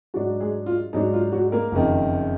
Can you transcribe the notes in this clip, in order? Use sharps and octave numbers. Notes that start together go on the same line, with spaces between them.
G#2 F#3 D4 F#4
G#3 G#4
F4
G#2 F#3 D4 D#4
F4
F#3 F#4
A#3 A#4
F#1 F2 D#3